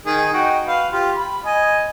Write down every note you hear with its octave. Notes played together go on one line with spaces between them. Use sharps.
D#3 G#4
D#4 F#4 G5
B4 F5
F4 G4
B5
D#5 G#5